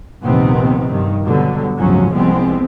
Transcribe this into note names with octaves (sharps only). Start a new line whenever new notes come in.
A#1 D#2 C3 D#3 B3 C4
G2 D#3
B2 D3 F#3 G3 B3
G1 C#2 A2 F3 F#3 C#4
C2 F3 G3 G#3 B3 C4